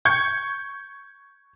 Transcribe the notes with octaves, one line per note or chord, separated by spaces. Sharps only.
C#6 G6 G#6 C#7